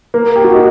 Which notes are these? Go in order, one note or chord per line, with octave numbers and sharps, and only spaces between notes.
A#3
G4
F#4
D#4